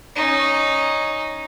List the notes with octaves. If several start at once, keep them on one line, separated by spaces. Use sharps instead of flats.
C#4 D#4